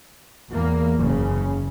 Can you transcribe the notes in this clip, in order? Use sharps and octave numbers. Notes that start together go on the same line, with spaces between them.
E2 A#3
F#1 C#3